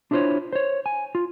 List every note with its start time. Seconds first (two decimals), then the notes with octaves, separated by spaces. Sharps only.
0.11 D4 E4 F4 G#4 C5 C#5
0.53 C5 C#5
0.86 G#5
1.15 F4